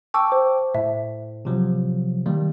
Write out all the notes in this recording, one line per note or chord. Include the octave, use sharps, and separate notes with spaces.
G5 A5 C#6 D6 E6
C5
A2 E5
C3 F3 F#3
D#3 G3 A#3